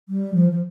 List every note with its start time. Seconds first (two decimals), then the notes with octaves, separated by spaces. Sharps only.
0.09 G3
0.34 F3
0.51 F3